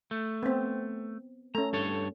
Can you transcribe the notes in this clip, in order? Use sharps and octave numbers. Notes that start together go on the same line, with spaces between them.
A3
B3 C4
A3 C#4 A#5
G2 A4 C#5